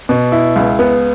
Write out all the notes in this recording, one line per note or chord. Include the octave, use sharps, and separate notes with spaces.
B2
E4
C#2
B3